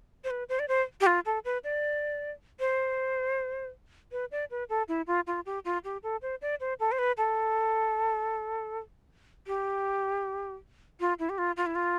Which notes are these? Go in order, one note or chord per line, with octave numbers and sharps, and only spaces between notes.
C5
B4
C5
D5
C5
G4
F4
A4
B4
D5
C5
B4
D5
B4
A4
E4
F4
F4
G4
F4
G4
A4
C5
D5
C5
A4
C5
B4
A4
G4
F4
E4
G4
F4
F4
E4
F4